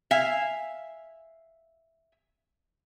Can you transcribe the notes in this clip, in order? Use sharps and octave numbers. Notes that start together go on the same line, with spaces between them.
E5 F5 G#5